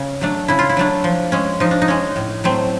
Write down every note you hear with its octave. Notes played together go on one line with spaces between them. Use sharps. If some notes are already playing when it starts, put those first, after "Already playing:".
Already playing: C#3
F#3 A3 D4
C#3 E4
F4
E4
F#3 A3 D4
F3
G#3 C#4
F3 D#4
D4
D#4
G#3 C#4
A2
F#3 A3 C4